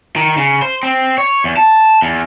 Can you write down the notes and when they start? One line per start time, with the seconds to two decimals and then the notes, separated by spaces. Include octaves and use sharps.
0.16 D#3
0.37 C#3
0.62 C5
0.83 C4
1.18 C#5
1.44 E2
1.57 A5
2.02 E2